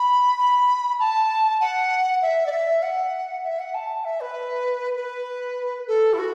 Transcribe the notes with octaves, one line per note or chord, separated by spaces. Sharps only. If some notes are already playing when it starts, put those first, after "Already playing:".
Already playing: B5
B5
A5
F#5
E5
D5
E5
F#5
E5
F#5
A5
E5
B4
B4
A4
E4
F#4